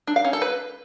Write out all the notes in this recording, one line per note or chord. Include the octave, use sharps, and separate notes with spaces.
D4
F5
C#4
A4
B4